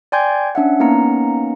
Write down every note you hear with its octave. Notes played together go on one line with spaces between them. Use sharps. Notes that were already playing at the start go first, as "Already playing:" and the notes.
D5 G5 G#5 C6 G6 G#6
C#4 D4 E5 F#5
A#3 B3 C#4 D#4 A#5 C#7